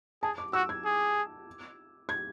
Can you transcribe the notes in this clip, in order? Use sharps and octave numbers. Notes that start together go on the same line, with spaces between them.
G#4 A5
D6
F#4 E6
G#6
G#4
G#6